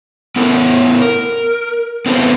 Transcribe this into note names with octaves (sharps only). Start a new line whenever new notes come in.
B3 E4 A4 A#4
A#4
B3 C4 E4 A4 B4 C5